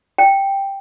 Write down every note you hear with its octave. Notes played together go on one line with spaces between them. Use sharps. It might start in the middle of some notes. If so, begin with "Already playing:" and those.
G5